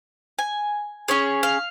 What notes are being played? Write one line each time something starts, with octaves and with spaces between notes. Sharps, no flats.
G#5
C#4 G#4 C#5
F5